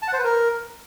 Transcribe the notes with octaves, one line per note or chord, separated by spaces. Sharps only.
A5
F#5
C5
B4
A#4